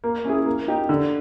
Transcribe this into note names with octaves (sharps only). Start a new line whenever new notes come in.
A#3
C#4 E4 G#4
A#3
D#4 G4
D3